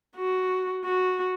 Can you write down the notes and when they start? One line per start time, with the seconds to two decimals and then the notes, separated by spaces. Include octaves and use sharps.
0.16 F#4
0.84 F#4